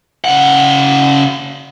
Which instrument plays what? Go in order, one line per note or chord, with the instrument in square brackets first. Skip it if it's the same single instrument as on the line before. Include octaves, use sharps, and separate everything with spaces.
[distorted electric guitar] C#3 F#5